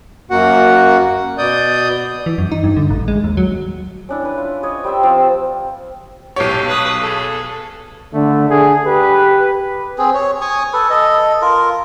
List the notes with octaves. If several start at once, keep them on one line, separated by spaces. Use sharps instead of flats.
F#2 A#3 F#4 F#5
B2 D5 D#6 G6
E3
F#2
D#4
G2
D3
A1
G#3
D#2
F#3
C#4 D4 E4
B4
F4
C5 C#5 D#5
G3 C5 E5 E6
F3 C4 F4 G4
B1 G4 C#5
B4 D#6
G#4 A4
D3 A3
D3 G#4
G4 B4
C4 G#4
C#5
G#5 C#6 D#6
A4 B4
A4 D#5
F4 A#4